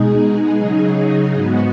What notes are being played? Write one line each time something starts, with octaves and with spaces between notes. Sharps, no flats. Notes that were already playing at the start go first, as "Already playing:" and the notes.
Already playing: B2 G#3 D#4 G#4
C#3 F#3 D#4 G#4
G#2 G#3 B3 F#4